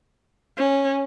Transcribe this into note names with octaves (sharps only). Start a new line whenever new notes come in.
C#4